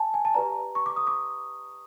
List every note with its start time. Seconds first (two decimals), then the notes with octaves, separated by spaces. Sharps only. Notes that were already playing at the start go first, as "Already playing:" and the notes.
Already playing: G#5 A5
0.14 G#5
0.25 A5
0.34 G4 B4 D5 A#5
0.75 C#6
0.86 D6
0.96 D#6
1.07 D6